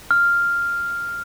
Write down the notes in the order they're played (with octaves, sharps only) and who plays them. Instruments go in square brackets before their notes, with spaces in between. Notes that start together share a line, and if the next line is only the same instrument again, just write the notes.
[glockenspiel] F6